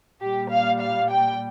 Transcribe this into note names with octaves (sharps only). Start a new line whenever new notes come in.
A#2 G3 G4
F5
F5
G5